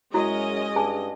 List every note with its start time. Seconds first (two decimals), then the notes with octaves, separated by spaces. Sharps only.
0.14 F#2 G#3 C#4 E4 F#4 D#5
0.76 G2 G#4 G#5 A5